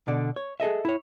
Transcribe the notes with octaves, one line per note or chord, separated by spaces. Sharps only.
B2 D3 D5
C#5
G#4 A4 D#5 E5
E4 C#5